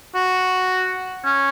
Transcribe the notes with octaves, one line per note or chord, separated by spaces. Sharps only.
F#4
C#4